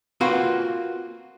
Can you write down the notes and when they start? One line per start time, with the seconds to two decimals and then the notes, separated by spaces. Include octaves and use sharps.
0.21 A#3 C4 F4 F#4 B4